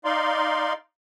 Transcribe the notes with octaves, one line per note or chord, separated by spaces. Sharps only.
D#4 D5 F5 C6